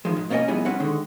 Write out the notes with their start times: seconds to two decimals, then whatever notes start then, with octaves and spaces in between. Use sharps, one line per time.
0.05 D#3 F3 G#3
0.17 G#2
0.30 A#3 B3 C#4 D5 D#5 G#5
0.48 F2 G3 B3 E4 G#4 G#5
0.65 G3 C4 C#4 B4 F#5
0.80 D3 D#3 G#3